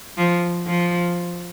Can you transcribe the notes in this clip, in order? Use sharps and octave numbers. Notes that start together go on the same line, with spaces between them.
F3
F3